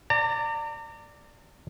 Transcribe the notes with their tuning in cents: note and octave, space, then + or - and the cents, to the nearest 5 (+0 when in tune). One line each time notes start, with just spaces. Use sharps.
D5 +0 A#5 -40